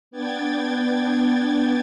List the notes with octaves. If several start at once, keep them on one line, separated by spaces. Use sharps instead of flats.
B3 D4 G5 G#6 A6